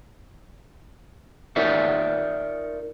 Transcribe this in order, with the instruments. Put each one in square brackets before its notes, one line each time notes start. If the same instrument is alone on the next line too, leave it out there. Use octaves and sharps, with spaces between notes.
[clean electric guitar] D#4 F4 A#4 C#5 D5 E5